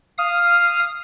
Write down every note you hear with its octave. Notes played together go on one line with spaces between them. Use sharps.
F5 D#6 F6